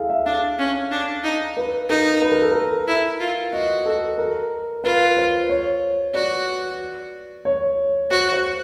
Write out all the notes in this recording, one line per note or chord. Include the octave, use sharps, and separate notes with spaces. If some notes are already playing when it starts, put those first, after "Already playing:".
Already playing: E4 G#4 A4 F5
E5
D4 F5
C#4
D4
D#4
B4
D#4 A#4
B4
A#4
A4
A#4
E4
F4
F#4 D#5
A4
A#4
F4 B4
C5
C#5
F#4 D5
C#5
F#4 C5
C5